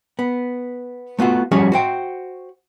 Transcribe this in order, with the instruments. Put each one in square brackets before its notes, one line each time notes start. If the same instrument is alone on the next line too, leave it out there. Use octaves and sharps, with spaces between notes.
[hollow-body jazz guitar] B3
A3 B3 F4 F#4
F3 G3 C#4 F#4 G#4 C#5
F#4 C5 G5